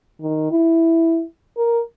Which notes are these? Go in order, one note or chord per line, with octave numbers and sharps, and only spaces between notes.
D#3
E4
A#4